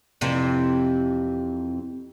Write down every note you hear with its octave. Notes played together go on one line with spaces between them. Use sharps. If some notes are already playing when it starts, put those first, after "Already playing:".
F2 C3 E3